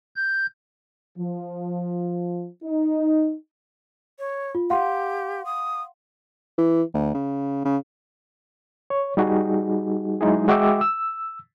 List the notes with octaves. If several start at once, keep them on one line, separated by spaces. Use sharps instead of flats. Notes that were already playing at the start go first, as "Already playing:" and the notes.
G6
F3
D#4
C#5
F4
G4 F5 F#5 C6
D#6
E3
D2
C#3
C#3
C#5
G3 D#4 F#4 G#4
F#3 G#3 D#4 E4 G#4
G#3 F#4 E5 G5 D6 E6
E6